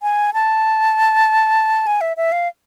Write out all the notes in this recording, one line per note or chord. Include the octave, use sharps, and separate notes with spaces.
G#5
A5
G#5
E5
E5
F5